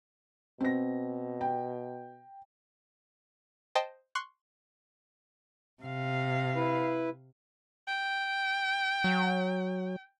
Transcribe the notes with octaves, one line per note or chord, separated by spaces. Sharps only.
B2 C4 A#6
G5
C5 D#5 G5 A5
C6 C#6 F#6
C3 F5
E4 B4
G5
F#3